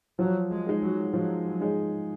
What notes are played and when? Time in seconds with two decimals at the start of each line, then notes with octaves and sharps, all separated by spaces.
0.19 F3 F#3
0.51 G#3
0.66 G#3 D#4 G#4
0.82 F#3
1.13 F3 F#3
1.45 F#3
1.61 G#3 D#4 G#4